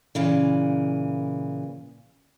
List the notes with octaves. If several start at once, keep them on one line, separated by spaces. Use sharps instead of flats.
A#2 C#3 E3